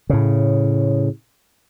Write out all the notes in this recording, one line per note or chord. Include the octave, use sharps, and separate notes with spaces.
A2 C#3